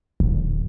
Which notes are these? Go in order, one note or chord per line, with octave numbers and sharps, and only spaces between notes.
D1